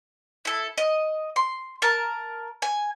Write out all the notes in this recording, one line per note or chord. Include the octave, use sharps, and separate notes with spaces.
E4 A4
D#5
C6
A#4 A5
G#5